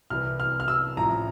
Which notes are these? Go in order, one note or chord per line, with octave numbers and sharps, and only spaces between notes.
C2 C3 E3 F6
F6
F6
E6
A1 A2 F3 A#5